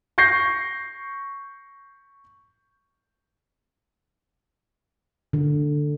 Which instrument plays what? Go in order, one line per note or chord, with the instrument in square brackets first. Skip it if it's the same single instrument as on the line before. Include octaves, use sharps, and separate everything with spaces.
[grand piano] C#6 G6 A#6 C7
[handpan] D3